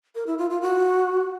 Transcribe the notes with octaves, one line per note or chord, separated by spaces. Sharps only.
A#4
E4
F4
F4
F#4